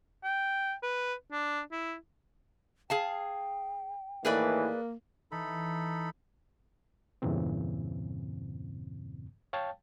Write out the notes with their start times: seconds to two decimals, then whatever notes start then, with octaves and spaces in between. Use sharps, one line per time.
0.24 G5
0.83 B4
1.32 D4
1.72 E4
2.90 G#4 F5 G5 A5
4.25 A2 D#3 E3 A#3 G#4 B4 D5
5.32 E3 D#4 A4 B5
7.22 E2 G2 A#2 C#3 E3 C4
9.53 C#5 F5 G5 A5